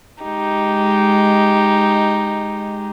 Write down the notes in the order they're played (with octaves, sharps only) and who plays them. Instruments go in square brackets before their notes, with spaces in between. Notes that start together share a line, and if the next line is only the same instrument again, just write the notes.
[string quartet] G#3 D#4 G4